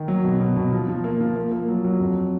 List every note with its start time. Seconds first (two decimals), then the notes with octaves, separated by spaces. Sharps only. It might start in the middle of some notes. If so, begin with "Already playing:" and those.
Already playing: D#3
0.08 F#3
0.24 B2
0.40 B2
0.56 B2
0.72 F3
0.88 F3
1.04 A#3
1.20 F3
1.36 A#3
1.52 A#3
1.68 F#3
1.85 F#3
2.00 F2